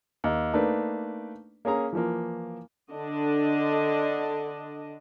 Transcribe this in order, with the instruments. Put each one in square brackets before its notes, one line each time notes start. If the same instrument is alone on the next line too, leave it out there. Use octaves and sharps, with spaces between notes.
[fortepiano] D#2
A3 A#3 D4 D#4 B4
A#3 C#4 G#4 A#5
E3 F3 A#3
[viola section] D3 D4 D#5